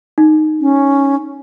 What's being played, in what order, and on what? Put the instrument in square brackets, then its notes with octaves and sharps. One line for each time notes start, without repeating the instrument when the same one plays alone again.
[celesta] D#4
[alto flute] C#4